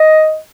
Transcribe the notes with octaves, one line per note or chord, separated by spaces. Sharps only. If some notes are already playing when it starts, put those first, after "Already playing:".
Already playing: D#5